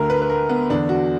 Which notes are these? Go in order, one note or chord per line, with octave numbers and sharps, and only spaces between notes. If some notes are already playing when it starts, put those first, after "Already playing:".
Already playing: D2 D3 A#4
B4
B4
A#4
B3
E2 D3 D4
F#4